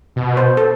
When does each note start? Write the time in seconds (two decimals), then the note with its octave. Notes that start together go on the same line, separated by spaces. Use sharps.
0.16 B2
0.37 C5
0.57 A4